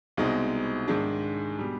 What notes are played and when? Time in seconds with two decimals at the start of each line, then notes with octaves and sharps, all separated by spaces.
0.17 C2 B2 G#3 C4 D#4
0.88 G#2 D#3 G#3 D4
1.59 B2 G3